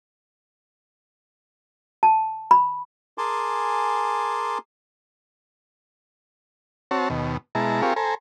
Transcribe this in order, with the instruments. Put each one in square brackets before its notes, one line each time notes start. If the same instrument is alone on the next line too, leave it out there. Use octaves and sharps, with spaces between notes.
[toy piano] A5
B5
[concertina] G#4 A#4 G#5 A5 C6 D6
[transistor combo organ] C4 F#4 C#5 A5
D#2 B2
B2 G#3 E4 A5 A#5
C4 F4 G4 G#4 A#4 C#6
A4 C5 G#5 A#5